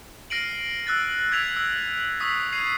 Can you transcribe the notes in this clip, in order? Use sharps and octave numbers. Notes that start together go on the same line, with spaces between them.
F6 A#6 C7 D7 D#7 F#7
E6 F#6 A6
E6 G#6 B6 D7 F7
E6
C#6 D#6 E6 B6 C7
G#6 C7 D#7